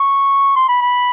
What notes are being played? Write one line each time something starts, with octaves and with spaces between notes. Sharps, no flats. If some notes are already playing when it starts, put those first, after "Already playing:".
Already playing: C#6
C6
B5
B5